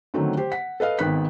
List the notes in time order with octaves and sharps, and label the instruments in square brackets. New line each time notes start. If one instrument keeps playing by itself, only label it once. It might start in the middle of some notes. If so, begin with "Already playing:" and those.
[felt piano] D3 D#3 F#3 A3 C4 C#4
G4 C5
F#5 B6
A4 B4 D#5 F5
G#1 D#3 B3 B5 F#6 B6